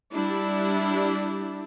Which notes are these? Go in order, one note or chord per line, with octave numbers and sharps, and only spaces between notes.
G3 D4 E4